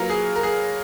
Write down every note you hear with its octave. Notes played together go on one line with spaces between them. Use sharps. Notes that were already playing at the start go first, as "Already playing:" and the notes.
Already playing: F#3 A#3 F4 A#4 B4
G#4
A#4
G#4